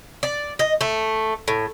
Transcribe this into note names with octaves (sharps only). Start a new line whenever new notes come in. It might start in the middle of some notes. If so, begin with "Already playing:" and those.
D5
D#5
A3
A2